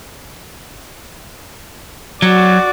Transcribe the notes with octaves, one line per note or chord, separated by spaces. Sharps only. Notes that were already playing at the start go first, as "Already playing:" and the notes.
F#3 F#4 D5